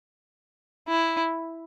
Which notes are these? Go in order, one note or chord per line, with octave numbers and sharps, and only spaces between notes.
E4